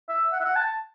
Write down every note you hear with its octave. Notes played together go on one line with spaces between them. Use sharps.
E5
F#5
E5
F#5
A5